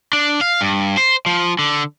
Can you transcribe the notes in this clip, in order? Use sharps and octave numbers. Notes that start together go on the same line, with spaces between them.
D4
F5
G2
C5
F3
D3